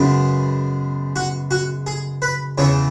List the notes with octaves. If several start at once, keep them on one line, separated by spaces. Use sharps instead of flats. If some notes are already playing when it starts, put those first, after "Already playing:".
Already playing: F#2 C#3 G#3 B3
F#4
F#4
G#4
B4
E2 C#3 E3 C#5